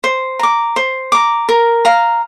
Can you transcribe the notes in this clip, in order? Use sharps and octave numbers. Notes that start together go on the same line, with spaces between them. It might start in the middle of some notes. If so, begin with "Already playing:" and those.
C5
A#5 D6
C5
A#5 D6
A#4
F5 A#5